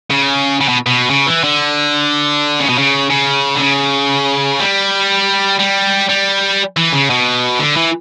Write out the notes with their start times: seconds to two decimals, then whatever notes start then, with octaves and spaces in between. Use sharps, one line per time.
0.11 C#3
0.61 C#3
0.69 B2
0.86 B2
1.10 C#3
1.27 E3
1.43 D3
2.60 C#3
2.69 B2
2.78 C#3
3.10 C#3
3.55 D3
3.60 C#3
4.60 G3
5.59 G3
6.09 G3
6.77 E3
6.93 C#3
7.10 B2
7.59 D3
7.76 E3